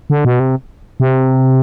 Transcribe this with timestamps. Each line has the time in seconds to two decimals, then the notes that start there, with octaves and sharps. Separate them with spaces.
0.10 D3
0.25 B2
0.40 C3
1.00 C3